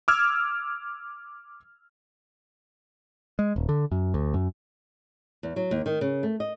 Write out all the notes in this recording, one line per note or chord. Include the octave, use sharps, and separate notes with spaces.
D6 E6 F6 G#6
G#3
D#1
D3
F#2
D2
F#2
E2
F#3
D#2
D#3
C#3
A3
D#5